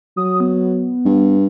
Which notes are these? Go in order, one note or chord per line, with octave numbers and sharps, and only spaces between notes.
F#3 D#6
B3
G2